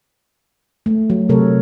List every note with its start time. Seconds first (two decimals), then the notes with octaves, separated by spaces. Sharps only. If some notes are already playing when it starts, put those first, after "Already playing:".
0.86 A3
1.10 F#3
1.29 C3 A3 A4 A#4 C#5